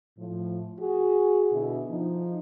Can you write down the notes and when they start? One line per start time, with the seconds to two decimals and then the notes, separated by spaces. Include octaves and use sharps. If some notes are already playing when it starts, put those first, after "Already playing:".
0.18 A2 F3
0.79 F#4 G#4
1.52 B2 D3 E4
1.89 F3 D#4